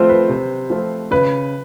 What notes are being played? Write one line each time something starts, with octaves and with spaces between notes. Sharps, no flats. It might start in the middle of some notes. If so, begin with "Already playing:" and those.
Already playing: F3 A3 C4 F4 C5
B4
C3
F3 A3 C4 F4
C#3 B4